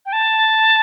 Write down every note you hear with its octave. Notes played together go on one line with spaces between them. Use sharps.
G5
A5